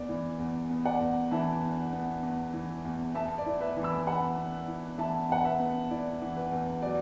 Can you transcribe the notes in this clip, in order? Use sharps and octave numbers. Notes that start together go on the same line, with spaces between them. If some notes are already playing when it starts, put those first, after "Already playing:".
Already playing: E2 B3 D5
E3
E2
B3
D5 F#5
E2
E3 E5 A5
E2
B3
E2
E3
E2
B3 E5 A5
D5
E4
B4 E5
E3
B5 E6
E2 F#5 B5
B3
E4
E3 E5 A5
E2 F#5
B4 E5
B3
E4 D5
E3
B4
E2
F#3 D5